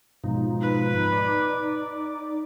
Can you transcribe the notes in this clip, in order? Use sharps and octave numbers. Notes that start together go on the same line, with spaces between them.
G#2 B2 F3 D#4
B4
D5